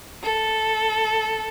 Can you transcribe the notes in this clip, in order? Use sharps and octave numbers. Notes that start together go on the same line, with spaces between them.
A4